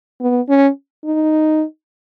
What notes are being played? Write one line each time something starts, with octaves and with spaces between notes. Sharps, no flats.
B3
C#4
D#4